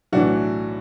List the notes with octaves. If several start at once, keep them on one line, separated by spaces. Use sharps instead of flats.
B1 A2 E3 D4 F#4